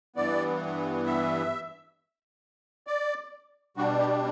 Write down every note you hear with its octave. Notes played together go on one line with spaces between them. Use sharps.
G2 E3 B3 D5
E5
D5
B2 G3 D4 F#4
G4